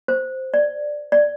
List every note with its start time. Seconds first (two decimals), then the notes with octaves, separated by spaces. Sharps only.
0.08 C5
0.54 D5
1.12 D5